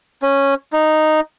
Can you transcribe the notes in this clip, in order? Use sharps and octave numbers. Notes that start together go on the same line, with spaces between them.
C#4
D#4